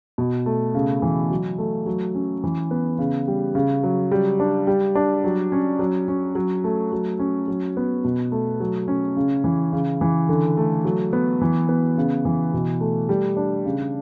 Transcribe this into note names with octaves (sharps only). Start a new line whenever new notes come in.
B2
A3
C#3
E3
F#3
A3
F#3
C#4
E3
B3
C#3
G3
C#3
F#3
G3
D4
G3
D4
F#3
C#4
F#3
C#4
F#3
A3
F#3
C#4
F#3
B3
B2
A3
F#3
C#4
C#3
E3
C#3
E3
D3
A3
F#3
B3
E3
B3
C#3
E3
B2
A3
G3
D4
C#3